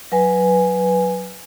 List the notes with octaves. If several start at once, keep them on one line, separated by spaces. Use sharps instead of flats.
F#3 B4 G#5